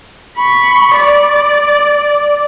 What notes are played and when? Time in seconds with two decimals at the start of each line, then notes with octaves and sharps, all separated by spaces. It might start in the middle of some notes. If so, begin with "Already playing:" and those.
0.37 B5 C#6
0.96 D5